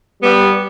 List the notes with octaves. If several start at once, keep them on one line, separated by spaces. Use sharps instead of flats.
G3 B3